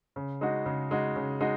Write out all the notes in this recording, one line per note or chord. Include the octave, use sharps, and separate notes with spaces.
C#3
G#3 D#4 F#4
C#3
G#3 D#4 F#4
C#3
G#3 D#4 F#4